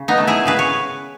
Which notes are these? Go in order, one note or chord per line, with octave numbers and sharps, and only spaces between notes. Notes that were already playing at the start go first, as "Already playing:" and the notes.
Already playing: C#3
B3 D#4
A3
E4 G#4
C#3 G#4 B4
C#5